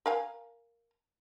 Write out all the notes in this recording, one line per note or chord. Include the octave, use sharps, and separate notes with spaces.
A#4 F5 G#5